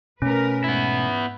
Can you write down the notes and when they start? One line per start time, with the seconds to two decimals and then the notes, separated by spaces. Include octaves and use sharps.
0.22 B2 A3 C#4 A#4 B4
0.64 G#2 B3 E4